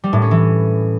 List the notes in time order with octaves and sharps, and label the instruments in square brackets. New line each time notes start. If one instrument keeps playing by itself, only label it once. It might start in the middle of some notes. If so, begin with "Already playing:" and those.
[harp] G3
A2
C#4
E3